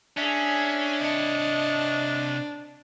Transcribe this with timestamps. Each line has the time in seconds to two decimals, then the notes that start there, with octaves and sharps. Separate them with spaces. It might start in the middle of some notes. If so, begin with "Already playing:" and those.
0.17 C#4 D4 G#4 E5
1.01 C3 C#5 D#5 A5